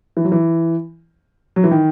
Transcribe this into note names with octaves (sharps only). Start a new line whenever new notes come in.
E3
F#3
E3
F#3
E3
D#3